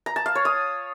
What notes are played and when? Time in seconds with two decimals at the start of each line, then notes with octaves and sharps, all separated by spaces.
0.06 A#5
0.16 A5
0.26 F5
0.35 C#5
0.45 D#6